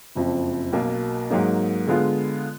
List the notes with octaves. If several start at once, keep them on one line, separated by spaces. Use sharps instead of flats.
F#1 F2 F3
B1 B2 A#3
G#2 F#3 A#3 D#4
D3 G#3 B3 F4